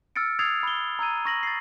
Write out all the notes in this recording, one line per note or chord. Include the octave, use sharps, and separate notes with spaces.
E6 F6 A6 C#7 D7
D#6 E6 G#6 A6 C7 F7
B5 G7
A#5 E6 G#6 D#7
C#6 A#6 F#7
A6 C7